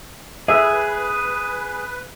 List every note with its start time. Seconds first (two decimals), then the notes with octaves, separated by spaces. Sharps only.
0.48 G#4 B4 E5